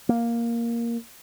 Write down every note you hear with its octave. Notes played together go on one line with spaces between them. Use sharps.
A#3